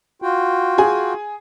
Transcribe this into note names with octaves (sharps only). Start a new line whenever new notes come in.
F4 F#4 G5
G#4 G#5